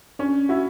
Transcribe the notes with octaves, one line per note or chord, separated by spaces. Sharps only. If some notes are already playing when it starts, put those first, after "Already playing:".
C#4 D4
E4 F#4